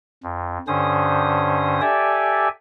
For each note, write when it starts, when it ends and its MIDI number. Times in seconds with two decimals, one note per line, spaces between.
0.23 0.58 41
0.68 1.81 43
0.68 1.81 50
0.68 1.81 61
0.68 1.81 72
0.68 1.81 87
1.81 2.48 67
1.81 2.48 69
1.81 2.48 74
1.81 2.48 76
1.81 2.48 80